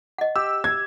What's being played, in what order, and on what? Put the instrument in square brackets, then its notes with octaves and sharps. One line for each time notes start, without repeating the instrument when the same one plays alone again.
[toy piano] D#5 F#5
[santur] G4 [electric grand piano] E6
[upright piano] G#6